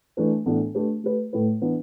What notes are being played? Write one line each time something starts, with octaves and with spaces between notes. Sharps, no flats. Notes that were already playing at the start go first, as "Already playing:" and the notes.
E3 A3 D4 B4
A2 E3 B3 D4 A4
A3 D4 G4 B4
A3 G4 B4
A2 A3 E4 B4
E3 B3 D4 B4